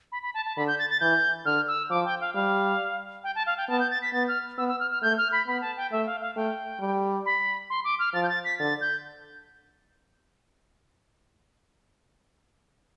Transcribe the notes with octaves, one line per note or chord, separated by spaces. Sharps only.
B5
B5
A5
A5
D3 B5
G6
A6
A6
E3 G6
D3 F6
E6
F3 D6
G5
F5
G3 F5
G5
A5
F5
G5
B3 A5
G6
A6
B6
B3 A6
F6
B3 E6
E6
F6
F6
A3 G6
F6
B5
B3 B5
A5
G5
A3 E5
F5
F5
A3 G5
G3
B5
C6
D6
F6
F3 A6
G6
A6
B6
D3 A6
G6